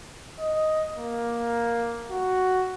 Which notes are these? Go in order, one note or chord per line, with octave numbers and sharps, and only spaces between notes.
D#5
A#3
F#4